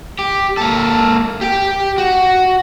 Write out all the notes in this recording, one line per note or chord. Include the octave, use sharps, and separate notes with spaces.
G4
A#3 A4
G4 G5
F#4